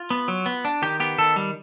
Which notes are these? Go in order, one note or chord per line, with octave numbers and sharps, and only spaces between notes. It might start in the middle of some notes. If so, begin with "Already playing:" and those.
Already playing: F4
B3
F#3
B3
D4
D#3 G4
B3 G4
D#3 A4
G3